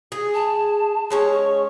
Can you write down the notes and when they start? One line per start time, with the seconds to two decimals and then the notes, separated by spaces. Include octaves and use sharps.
0.12 G#4
0.34 A5
1.10 G#3 C#4 C#5
1.33 C#6